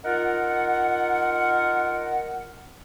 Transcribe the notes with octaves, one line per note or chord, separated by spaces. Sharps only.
D#4 F4 A#4 F#5